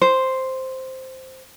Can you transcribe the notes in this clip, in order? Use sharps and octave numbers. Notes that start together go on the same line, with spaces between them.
C5